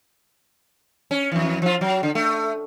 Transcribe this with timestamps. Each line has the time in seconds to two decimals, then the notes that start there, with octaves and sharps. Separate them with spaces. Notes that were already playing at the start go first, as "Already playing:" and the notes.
1.11 C#4
1.32 F2 E3
1.62 F3 F4
1.81 F#3
2.03 D3
2.15 A3